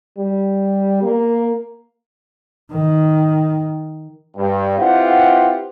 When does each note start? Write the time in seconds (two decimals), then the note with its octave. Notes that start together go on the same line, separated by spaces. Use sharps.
0.18 G3
1.03 A#3
2.72 D#3
4.37 G2
4.78 C4 E4 F4 G4 B4 F#5